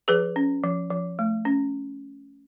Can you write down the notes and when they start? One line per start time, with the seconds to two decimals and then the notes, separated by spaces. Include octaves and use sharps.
0.08 F3 G#4 B4
0.36 C#4
0.64 F3
0.90 F3
1.19 A3
1.45 C#4